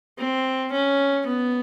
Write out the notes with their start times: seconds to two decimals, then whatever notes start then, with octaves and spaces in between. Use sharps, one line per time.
0.18 C4
0.72 C#4
1.26 B3